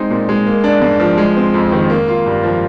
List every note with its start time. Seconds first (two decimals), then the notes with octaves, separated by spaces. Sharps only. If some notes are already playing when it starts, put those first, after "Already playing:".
Already playing: G#3 C4 D#4
0.10 A#2
0.29 G#3
0.47 A#3
0.64 D4
0.82 G#2
1.00 F3
1.18 G#3
1.36 C4
1.54 F2
1.72 D#3
1.90 A#3
2.08 F4
2.26 G2
2.43 F3